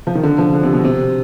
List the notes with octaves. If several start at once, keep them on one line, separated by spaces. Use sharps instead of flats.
F3
D#3
D3
F3
D3
C3
B2
C3